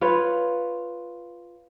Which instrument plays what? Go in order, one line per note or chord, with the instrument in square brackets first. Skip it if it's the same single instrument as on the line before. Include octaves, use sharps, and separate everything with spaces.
[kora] F4 B4 C#5